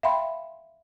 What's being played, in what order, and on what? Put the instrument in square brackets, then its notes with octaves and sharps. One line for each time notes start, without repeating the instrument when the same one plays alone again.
[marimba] E5 F5 G5 B5 C6